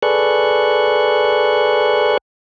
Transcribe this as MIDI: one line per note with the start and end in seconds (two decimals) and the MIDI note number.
0.02 2.18 68
0.02 2.18 69
0.02 2.18 71
0.02 2.18 74
0.02 2.18 85
0.02 2.18 90